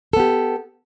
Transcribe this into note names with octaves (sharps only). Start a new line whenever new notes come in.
B3 G4 A4